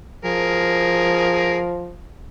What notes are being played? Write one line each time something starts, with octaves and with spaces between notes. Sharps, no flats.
F3 G#4 A#4